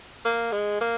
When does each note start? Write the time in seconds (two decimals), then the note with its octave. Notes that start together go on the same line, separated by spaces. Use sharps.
0.25 A#3
0.52 G#3
0.81 A#3